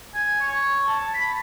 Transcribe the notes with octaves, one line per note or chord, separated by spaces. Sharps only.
G#5
C#5
A5
B5